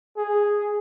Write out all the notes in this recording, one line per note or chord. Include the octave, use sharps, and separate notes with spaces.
G#4